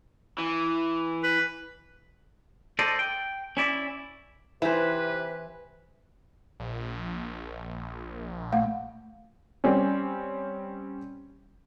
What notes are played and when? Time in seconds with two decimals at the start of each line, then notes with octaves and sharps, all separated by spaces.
0.38 E3
1.23 B4
2.79 A4 C5 D5 D#5
2.99 G5
3.57 C#4 E4 D5
4.62 C3 E3 B4 C5
6.60 A#1
8.53 A3 F5 F#5
9.64 G3 C4 C#4